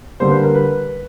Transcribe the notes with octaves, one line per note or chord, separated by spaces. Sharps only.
D3 G3 A#3 C5
B4
A#4
B4